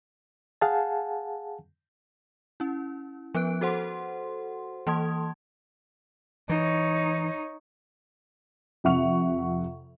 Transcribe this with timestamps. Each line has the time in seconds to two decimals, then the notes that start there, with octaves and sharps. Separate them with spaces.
0.61 G#4 F5 F#5 G#5 A5
2.60 C#4 E4
3.34 F3 B3 B4 F#6 D7
3.61 F#4 A4 C5 F#5 C6
4.87 E3 A#3 A5 C6 D#6 G#6
6.49 E3 D#4 C#5
8.84 F2 C3 E5 F#5 C#6 F7